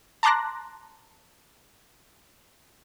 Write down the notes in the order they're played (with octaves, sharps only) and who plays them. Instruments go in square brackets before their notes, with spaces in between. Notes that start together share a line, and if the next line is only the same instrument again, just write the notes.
[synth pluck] A5 A#5 C6 D6 F#6 A#6